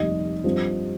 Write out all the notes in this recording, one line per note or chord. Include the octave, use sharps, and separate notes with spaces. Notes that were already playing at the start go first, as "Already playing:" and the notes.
Already playing: F1 D#2 D#3 G3 D#5
G2 F3 C4